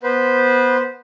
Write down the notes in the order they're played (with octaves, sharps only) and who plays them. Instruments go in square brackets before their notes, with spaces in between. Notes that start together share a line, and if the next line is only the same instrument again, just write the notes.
[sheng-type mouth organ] B3 B4 C5